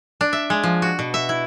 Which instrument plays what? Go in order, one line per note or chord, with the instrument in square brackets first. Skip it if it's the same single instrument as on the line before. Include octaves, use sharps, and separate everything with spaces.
[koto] D4
E5
G#3
F3
F#4
B2
E5
E4